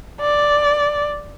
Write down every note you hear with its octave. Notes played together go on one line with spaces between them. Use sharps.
D5